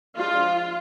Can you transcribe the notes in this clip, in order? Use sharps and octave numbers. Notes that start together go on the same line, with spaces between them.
F3 G#3 D4 F4